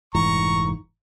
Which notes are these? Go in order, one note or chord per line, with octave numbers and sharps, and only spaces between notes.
F1 G#2 E3 A#5 C#6